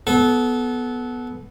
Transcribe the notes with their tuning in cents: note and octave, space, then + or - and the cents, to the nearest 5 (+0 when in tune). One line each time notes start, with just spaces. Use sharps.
B3 +0 A4 -25